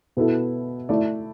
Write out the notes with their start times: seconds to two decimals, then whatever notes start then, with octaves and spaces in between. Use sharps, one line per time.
0.17 B2 B3 E4 A4
0.89 A3 E4 D5